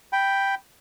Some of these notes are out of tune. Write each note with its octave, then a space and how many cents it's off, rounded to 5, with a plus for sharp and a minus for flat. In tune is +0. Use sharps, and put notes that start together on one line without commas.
G5 +0 B5 +0